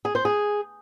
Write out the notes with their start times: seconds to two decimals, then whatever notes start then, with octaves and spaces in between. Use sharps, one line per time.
0.05 G#4
0.15 C5
0.25 G#4